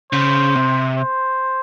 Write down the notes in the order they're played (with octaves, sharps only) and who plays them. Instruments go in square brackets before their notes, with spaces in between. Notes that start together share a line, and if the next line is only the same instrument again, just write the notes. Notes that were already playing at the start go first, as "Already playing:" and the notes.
[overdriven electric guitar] C#3 [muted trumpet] C5
[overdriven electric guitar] C3
[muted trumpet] C5